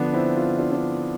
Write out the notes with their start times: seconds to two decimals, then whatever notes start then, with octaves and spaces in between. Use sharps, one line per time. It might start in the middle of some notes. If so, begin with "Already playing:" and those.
Already playing: D3 F3 B3 D4
0.13 C4 E4
0.36 F4
0.58 D4 F4
0.72 D4 F4